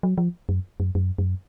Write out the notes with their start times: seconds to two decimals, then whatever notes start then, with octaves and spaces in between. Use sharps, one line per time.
0.03 F#3
0.18 F3
0.49 F#2
0.80 F#2
0.95 F#2
1.18 F#2